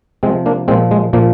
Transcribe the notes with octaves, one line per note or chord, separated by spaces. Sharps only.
C3 F3 G#3 C4
A#3 D4
A#2 F3 G#3 C4
G#3
A#2 F3 A#3